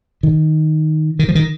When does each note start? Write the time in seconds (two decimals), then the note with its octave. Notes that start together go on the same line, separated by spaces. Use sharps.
0.23 D#3
1.19 D#3
1.28 F3
1.35 D#3